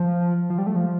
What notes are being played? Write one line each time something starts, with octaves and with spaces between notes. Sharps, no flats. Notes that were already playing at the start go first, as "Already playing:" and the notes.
Already playing: F3
F3
G3
A3
F3